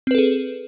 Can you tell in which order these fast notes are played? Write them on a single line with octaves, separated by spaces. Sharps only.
C4 B4 A4 G#4